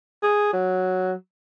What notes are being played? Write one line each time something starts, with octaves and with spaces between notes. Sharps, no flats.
G#4
F#3